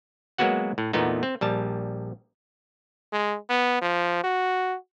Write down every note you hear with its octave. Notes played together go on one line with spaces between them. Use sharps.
F#3 G#3 A#3 B3 F#4 F#5
A2
E2 A#2 A3 B3 D#4
C4
A#1 G3 A5
G#3
B3
F3
F#4